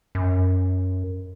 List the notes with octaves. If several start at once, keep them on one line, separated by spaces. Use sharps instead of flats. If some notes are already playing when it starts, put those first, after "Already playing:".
F#2